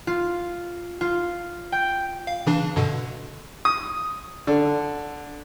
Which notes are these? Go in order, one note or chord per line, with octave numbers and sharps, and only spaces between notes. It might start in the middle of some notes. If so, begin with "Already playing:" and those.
F4
F4
G5
F5
C#3 E3 D4
G2 B2 D3
D#6
D3